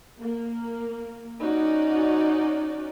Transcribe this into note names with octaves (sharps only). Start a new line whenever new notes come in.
A#3
C#4 D#4 F#4 D5